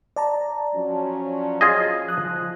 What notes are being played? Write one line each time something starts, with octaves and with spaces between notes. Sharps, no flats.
D5 A5 A#5
F3 F#3 C#4
F4 G#4 D#5
F3 D#6 F#6